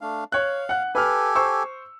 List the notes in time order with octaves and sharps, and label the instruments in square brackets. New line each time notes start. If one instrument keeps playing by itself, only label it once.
[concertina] A3 D4 F5
[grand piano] C#5 F#6 [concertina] F5
[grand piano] F#5 F#6
[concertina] G4 A4 G#5 [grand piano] B4 F6
[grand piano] C5 C#6 E6